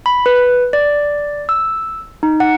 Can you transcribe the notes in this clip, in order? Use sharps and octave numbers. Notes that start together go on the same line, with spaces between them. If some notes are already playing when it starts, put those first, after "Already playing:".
B5
B4
D5
E6
D#4
F#5